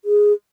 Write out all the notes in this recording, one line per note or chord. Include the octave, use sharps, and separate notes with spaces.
G#4